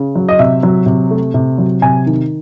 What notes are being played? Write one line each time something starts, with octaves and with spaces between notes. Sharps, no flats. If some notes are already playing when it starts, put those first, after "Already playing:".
Already playing: C#3
F#3
D#5
C3 E5
F#3
C3
A3
C3
F#3
C3 G#5
D#3